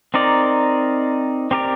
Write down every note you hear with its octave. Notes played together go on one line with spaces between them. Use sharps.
C4 D#4 A#4 D5
C4 G4 A#4 D5